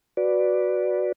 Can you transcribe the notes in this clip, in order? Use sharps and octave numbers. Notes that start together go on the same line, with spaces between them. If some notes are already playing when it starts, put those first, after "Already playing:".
F#4 B4 D5